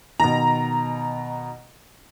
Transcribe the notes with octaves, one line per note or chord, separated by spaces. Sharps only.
B2 D#3 A#5